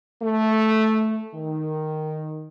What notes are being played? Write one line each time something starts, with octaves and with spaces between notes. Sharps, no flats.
A3
D#3